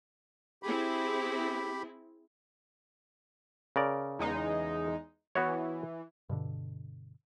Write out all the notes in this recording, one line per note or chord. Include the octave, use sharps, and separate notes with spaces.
C4 E4 G4 G#4 B5
C#3 A#4 D5
E2 G#3 D#4
E3 B3 F#4 C#5
G2 B2 D3